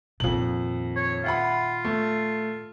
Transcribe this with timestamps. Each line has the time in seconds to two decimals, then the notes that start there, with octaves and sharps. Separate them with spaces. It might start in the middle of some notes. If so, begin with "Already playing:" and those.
0.20 F2 A#2 D#3 F#7
0.96 C#5
1.24 F4 E5 F#5 B5
1.85 A3